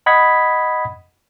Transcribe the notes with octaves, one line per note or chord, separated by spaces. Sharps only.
D#5 F#5 B5 D#6 G#6 B6